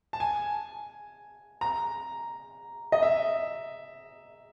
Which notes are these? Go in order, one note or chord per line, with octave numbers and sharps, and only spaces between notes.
A5
G#5
A#5
D#5
E5